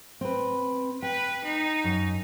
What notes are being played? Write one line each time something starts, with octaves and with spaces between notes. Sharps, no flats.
C4 B4
B4 G5
D#4
F#2